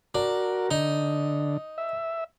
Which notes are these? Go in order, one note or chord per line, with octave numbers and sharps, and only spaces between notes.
D4 F#4 A#4
D3 D#4
E5